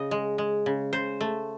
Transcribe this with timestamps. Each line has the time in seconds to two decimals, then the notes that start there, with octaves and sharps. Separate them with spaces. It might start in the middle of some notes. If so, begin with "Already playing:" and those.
Already playing: C#3 D#5
0.11 G#3
0.38 G#3
0.66 C#3
0.93 C#3 C5
1.21 A3